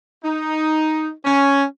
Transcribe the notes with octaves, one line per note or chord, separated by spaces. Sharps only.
D#4
C#4